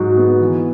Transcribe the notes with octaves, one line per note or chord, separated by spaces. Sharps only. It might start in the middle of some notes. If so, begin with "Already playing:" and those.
Already playing: G#2 F#3 F#4
B3
E3